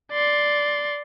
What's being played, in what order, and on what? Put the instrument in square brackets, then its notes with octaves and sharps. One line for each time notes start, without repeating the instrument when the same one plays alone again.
[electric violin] D5 C6